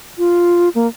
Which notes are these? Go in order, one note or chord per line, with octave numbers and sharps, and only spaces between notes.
F4
A#3